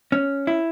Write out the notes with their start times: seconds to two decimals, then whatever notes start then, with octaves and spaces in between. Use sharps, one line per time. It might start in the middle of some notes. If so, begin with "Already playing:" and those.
0.12 C#4
0.47 E4